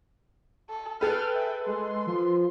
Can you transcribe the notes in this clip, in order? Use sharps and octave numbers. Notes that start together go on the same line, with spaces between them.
A4
G#4 A4 B4 G5 F6
E5
G#3 C6
F3